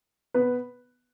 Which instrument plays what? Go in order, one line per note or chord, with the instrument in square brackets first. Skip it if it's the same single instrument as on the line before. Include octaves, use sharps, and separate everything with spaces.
[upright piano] B3 B4